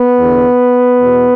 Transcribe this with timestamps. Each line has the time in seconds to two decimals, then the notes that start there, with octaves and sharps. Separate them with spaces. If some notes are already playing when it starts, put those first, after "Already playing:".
Already playing: B3
0.17 E2 D3
0.99 E2 B2